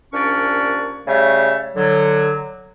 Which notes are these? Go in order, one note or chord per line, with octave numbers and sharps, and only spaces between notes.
C2 A#2 C#4 D4 D5 C#6
C#3 G3 A3 C#5 E5
D3 F#3